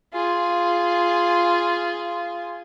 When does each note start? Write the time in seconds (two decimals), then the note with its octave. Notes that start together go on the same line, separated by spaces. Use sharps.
0.14 F4 G#4